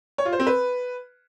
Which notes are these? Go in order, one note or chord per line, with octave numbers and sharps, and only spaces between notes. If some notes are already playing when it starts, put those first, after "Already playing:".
C#5
F4
C5
C4
B4